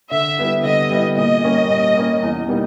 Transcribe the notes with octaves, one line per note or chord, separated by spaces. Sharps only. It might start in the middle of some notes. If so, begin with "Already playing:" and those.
D3 E5
G3 B3 E4
D3 D#5
G3 B3 E4
A#2 D#5
G3 A#3 C#4
A#2
G3 A#3 C#4
E2
B2 G3 A#3 D#4